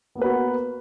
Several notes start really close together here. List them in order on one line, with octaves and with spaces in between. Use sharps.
B3 A#3 B4 F#4 A#4